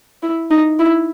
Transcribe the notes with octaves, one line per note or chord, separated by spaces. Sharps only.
E4
D#4
E4